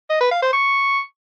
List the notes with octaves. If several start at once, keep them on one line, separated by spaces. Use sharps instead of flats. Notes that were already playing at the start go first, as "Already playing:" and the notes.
D#5
B4
F5
C5
C#6